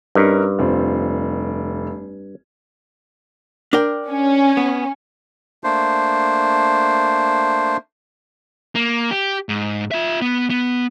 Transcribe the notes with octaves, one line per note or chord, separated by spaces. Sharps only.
G2 C#4 D#4 A#4
F1 C4 F4
D4 A#4 G5
C#4
B3
A3 A#3 D4 C5
A#3
G4
G#2
F4 E5
B3
B3